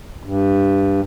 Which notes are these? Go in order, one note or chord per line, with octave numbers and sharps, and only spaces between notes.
G2